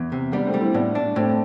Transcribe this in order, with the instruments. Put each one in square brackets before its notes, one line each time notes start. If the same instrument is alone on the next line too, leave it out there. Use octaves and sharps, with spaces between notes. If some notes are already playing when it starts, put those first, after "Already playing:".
Already playing: [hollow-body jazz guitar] E2
C3
[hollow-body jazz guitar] G3 [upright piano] B3 D4
[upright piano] A3 C4
[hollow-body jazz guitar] G3
[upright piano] C4 E4
[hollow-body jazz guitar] A2 [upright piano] B3 D4
[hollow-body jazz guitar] D4
[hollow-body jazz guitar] A2 [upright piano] A3 C4